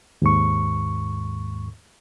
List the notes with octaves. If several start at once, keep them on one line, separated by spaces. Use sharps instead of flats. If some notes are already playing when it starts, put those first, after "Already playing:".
D#2 G#2 C#6